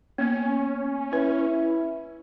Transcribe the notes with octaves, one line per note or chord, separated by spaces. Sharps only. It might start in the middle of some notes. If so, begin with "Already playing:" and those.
A#3 B3 C#4
E4 B4